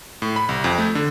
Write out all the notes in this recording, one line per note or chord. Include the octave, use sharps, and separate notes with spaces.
A2
B5
C2
F2
A3
D3